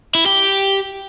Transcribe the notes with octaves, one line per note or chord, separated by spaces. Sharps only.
E4
G4